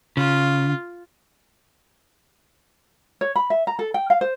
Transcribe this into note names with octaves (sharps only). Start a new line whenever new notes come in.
C#3 F4
C#5
B5
E5
A#5
A4
G5
F5
C5